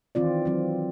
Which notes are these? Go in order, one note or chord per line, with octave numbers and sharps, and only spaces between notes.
D#3 E3 C4 F4 D5
F#3 C4